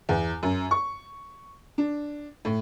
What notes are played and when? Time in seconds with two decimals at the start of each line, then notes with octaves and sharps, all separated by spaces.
0.09 E2
0.43 F#2
0.71 C#6
1.78 D4
2.45 A2